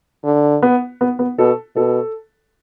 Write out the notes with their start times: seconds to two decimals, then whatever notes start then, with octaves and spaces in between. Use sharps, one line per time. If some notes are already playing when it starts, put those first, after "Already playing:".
0.24 D3
0.62 B3
1.01 B3
1.19 B3
1.39 B2 A4
1.76 B2 A4